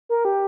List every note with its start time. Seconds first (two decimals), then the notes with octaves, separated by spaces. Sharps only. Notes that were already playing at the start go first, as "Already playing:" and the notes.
0.09 A#4
0.25 G4